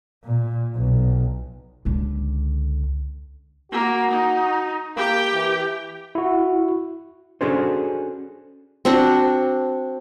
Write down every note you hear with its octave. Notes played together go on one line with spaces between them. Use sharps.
A#2
B1
C#2 D3
A#3 F#4
D#4
A#3 G4 G5
E3
E4 F#4
C#4 D4 F#4 G#4 A4 C5
C4 D4 F#4